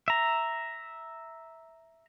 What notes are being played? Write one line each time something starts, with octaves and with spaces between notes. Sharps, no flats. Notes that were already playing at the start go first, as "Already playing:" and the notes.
E5 A#5